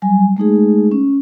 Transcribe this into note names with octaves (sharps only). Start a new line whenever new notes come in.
F#3 G3 G#5
G#3 A3 D#4 G#4
C#4